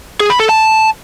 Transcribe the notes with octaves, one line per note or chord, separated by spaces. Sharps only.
G#4
B5
A4
A5